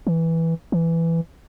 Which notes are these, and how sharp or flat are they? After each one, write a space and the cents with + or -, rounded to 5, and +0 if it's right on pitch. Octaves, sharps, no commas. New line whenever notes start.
E3 -5
E3 +10